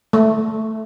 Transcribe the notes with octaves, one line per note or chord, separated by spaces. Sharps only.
A3